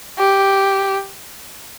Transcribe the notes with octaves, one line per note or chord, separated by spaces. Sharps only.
G4